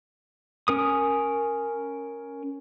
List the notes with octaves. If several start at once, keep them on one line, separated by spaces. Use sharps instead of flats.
C#4 A#4 D#6